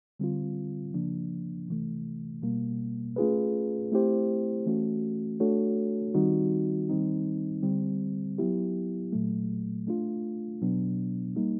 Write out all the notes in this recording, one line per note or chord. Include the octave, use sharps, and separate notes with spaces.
D3 G3 C4 F4
C#3 F3 A#3 D4
C3 E3 A3
B2 G3 A#3
A3 C#4 F4 G#4 B4
A3 C4 E4 G4 C5
E3 A3 C#4 F#4
A3 D4 F#4 A4 C#5
D#3 G3 C4 D#4 F#4
D#3 G3 C4 D#4
D3 G3 C4
F#3 B3 E4 G4
A#2 F#3 A3
A3 D4 F4
B2 F#3 B3 D4
G3 A#3 D#4